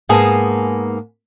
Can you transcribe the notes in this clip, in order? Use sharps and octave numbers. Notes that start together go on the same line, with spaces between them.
G#2 A#3 B3 G#4 A5